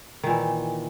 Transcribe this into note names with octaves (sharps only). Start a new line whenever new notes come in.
A#2 D#3 E3